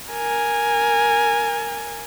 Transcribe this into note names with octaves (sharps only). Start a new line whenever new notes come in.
A#4 G#5